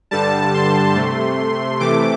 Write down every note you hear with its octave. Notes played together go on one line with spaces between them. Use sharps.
G2 D3 G3 A5
C6
C3 A3
C3 E3 A3 D6